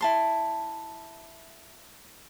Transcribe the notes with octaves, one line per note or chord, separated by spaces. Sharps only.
E4 A5 C6